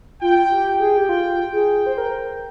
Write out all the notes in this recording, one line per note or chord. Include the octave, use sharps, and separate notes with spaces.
F4 G5
G4
G5
G#4
G4
F4
G#4
C5
A#4